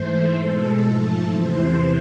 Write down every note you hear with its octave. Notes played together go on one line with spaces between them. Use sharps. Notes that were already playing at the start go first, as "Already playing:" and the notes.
Already playing: G#2 E3 A3 C5
B2 G#3 A4
G#2 F3 A3
E2 C3 E3 C5